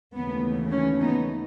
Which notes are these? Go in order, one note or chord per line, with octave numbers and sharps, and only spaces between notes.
D#2 C#3 E3 A3 B3
C#4
B3 D#4